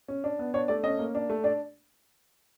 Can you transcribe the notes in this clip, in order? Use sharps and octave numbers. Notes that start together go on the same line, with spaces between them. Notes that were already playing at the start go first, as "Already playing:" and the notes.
C#4
D4
B3
D4 C#5
A3 D5
C#4 D#5
A#3
D4
A3
D4 D5